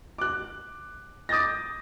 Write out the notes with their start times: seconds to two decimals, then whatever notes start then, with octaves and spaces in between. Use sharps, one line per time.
0.18 D6 F#6
1.29 D6 D#6 G6 A6 A#6